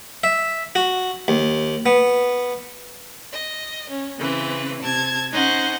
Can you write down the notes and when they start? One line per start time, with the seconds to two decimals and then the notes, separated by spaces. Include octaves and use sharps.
0.24 E5
0.75 F#4
1.28 D#2
1.86 B3
3.32 D#5
3.88 C#4
4.18 C#3 E3 C4 B4
4.80 C3 A5 G#6
5.31 C#4 D#4 C5 F#5 G#5